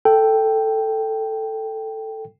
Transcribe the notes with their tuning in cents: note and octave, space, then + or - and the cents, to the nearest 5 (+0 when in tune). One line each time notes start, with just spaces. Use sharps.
A4 +5 G5 +0